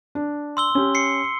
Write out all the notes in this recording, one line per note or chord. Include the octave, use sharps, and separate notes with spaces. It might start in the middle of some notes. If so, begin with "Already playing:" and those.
D4
C6 E6 G7
C#4 G4
C7 C#7